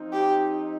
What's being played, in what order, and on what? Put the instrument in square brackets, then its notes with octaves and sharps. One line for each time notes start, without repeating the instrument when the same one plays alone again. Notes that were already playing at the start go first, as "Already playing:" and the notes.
Already playing: [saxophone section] F3 C4 D#4
[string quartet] G4